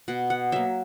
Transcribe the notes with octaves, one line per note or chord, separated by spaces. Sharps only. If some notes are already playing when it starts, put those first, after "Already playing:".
B2 F#5
F#5
F#3 A#3 E5